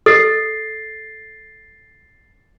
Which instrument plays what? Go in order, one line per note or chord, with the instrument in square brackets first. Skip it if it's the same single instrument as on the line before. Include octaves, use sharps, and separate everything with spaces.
[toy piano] A4 [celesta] A6 C7